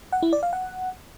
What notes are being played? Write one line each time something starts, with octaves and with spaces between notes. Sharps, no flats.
F#5
E4
D5
F5
F#5